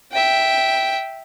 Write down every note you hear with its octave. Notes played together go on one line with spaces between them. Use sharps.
E5 G5